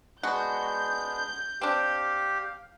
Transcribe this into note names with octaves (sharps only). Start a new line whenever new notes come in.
G#3 B3 D4 F#4 G6
C4 D4 G4 F5